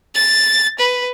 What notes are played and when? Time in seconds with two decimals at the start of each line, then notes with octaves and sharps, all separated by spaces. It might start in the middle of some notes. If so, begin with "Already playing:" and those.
0.15 A6
0.79 B4